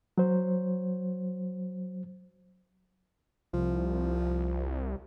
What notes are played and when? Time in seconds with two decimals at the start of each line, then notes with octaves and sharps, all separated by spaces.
0.18 F#3 C5
3.54 C2 F3